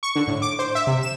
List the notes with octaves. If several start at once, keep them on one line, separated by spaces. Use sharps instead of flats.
C#6
D3
A2
D6
C5
E5
C3
E7